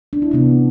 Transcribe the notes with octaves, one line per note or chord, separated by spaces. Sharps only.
D4
E4
C3 E3 B3 D4